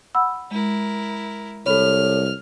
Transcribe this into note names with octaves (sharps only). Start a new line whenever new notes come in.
F#5 B5 E6
G#3 E4 A#4
C2 A4 C#5 B5 F6